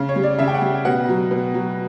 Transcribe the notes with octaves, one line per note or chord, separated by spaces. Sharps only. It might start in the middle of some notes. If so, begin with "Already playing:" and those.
Already playing: C#3
C#5
G3
D5
C#3 E5
G5
F#5
G3
B2 F#5
F#3
B2
F#3